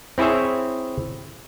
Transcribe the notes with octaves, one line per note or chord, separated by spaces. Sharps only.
C4 E4 G#4 C#5 E5